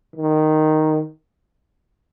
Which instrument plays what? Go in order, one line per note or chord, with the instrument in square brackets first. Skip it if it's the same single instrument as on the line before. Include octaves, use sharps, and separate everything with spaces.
[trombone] D#3